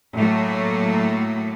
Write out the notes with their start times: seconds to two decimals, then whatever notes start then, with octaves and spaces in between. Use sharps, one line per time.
0.15 A2 F#3 A3 A#3